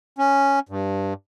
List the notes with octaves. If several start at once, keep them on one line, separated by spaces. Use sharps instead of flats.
C#4
G2